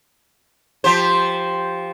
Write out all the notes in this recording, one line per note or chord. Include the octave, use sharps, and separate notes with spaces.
F3 G4 C5